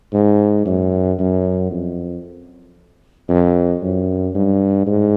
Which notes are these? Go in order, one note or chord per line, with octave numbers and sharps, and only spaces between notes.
G#2
F#2
F#2
F2
F2
F#2
G2
G#2